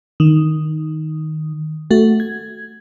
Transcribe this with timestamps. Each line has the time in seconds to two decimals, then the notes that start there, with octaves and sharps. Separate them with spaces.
0.20 D#3
1.91 A3 F#4
2.20 G#6